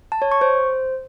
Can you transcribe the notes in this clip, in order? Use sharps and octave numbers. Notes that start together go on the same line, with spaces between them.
A5
C#5
C#6
C5